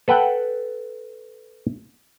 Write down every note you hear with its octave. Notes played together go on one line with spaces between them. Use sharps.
A4 B4 F#5 G5